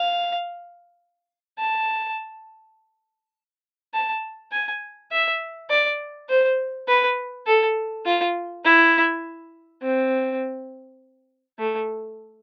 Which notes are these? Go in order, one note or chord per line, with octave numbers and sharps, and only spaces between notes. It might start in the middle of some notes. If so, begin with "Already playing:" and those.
Already playing: F5
A5
A5
G#5
E5
D5
C5
B4
A4
F4
E4
C4
A3